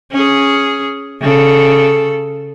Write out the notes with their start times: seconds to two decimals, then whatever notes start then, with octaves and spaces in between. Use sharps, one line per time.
0.12 C#4 G#4
1.21 C#3 A4